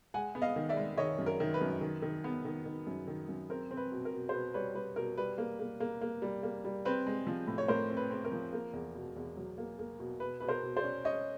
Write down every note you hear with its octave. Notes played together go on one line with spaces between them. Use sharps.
G#3 F#5 G#5
B3
D#5 F5
D#3
D5 E5
G#3
D#3 C#5 D#5
F#2
A#4
D#3
B4
F#2
D#3
D#3
B3
D#3
D#3
F#2
D#3
F#2
C4 A#4
C4
B4
B2
A#4
B2
C5
B2 B4
G3 B4 C#5
G3 B4
B2 A#4
G3 B4
A#3
A#3
A#3
A#3
G3
A#3
G3
C4 B4
G#3
F3
A2
C#5
A2 A#4 C5
C4
B4
C4
A#4
F3
A#3
E2
B2
E2
F#3
A#3
A#3
B2
B2 B4
B2 B4
A#4 C5
B2
C5 D5
C#4
C#4 C#5 D#5